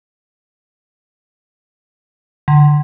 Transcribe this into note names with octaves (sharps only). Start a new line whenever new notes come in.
D3